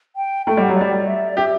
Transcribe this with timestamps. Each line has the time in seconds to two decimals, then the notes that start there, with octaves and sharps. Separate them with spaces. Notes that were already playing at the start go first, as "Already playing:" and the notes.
0.16 G5
0.46 A3 G5
0.57 G3 F#5
0.69 F#3
0.77 G3 D5
1.07 E5
1.29 D5
1.37 G4 E5